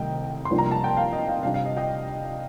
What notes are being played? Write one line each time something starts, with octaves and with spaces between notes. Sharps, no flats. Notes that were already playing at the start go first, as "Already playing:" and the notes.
Already playing: C2 C3 D#3 A3 D#5 G5
C6
C2 C3 F3 A#3 D4
A#5
A5
G5
F5
D#5
F5
C3 G3 D4 F5
F5
D#5
D#5 G5